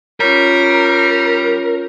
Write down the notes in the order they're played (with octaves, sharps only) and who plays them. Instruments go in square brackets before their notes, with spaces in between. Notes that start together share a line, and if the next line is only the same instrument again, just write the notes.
[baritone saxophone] G3 [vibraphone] C#4 F4 C#5 [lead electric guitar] A#4